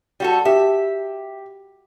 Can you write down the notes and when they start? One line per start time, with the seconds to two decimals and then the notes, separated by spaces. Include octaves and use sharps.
0.20 G3 F#4 A4
0.45 G4 E5